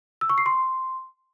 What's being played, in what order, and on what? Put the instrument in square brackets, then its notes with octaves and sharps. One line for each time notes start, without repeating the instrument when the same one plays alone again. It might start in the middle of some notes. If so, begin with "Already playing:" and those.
[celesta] E6
C#6
C7
C6